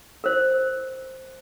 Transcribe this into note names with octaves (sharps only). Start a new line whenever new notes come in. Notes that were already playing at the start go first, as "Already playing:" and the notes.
A#4 C5